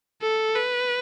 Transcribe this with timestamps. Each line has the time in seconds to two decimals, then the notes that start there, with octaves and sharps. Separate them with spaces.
0.22 A4
0.56 B4